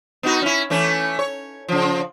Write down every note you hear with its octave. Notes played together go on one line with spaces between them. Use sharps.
B3 D#4 F#4
C#4 E4
E3 A3 C#4
C#5
C#3 F3